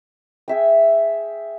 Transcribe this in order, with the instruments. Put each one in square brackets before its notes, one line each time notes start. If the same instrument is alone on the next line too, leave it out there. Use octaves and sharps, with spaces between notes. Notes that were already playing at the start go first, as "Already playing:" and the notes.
[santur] G#4 E5 G5